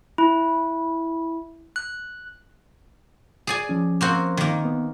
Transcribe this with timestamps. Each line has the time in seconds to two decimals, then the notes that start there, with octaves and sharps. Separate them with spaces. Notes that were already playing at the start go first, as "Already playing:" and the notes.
0.18 E4
1.76 F#6
3.47 G#4 D5 G#5
3.69 F3 C#4
4.01 A#3 C4 F#4
4.37 D#3 A#3
4.65 B3